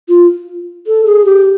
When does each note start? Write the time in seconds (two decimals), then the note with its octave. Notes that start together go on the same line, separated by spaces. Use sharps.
0.09 F4
0.87 A4
1.06 G#4
1.25 G4